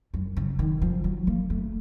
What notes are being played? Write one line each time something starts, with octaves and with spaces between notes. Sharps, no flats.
F#2
C#3
D#3
F3
F#3
A#3
A3